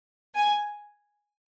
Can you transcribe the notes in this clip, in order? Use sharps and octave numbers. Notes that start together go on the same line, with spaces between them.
G#5